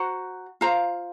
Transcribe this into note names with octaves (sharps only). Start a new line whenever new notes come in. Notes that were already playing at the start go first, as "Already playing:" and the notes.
Already playing: F#4 C5 F#5 A#5
F4 C5 F5 A#5